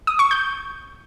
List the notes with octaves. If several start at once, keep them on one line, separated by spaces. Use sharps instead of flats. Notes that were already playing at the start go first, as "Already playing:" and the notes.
D#6
C#6
G6